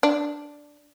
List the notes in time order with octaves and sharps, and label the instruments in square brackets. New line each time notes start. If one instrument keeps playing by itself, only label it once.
[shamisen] D4